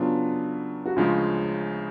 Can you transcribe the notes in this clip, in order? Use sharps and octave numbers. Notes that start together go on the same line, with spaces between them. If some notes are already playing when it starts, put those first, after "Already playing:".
Already playing: C#3 F#3 B3 D4 F4
F#4
D2 C#3 F3 G#3 C#4 F4